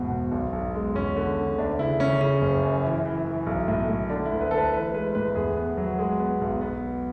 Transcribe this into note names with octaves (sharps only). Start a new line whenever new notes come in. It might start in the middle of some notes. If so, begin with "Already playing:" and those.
Already playing: G#1 E2 B2
B2
B1
B1
G#3
E2 C#4
D3
D3
D2 D4
C#3 E4
C#3 C#4
C#3 C#4
F#1
F#2
E3
E3
E3
B1
A2
A2
D3 D4
E4
D2
B4
D2 A4
B4
E3 B4
G#3 B4
A2 B4
E2 G#4
B3
F#3
G#3 G#4
B3
B1
B3